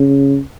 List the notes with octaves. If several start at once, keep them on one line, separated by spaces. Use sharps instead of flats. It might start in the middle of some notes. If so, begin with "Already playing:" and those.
Already playing: C#3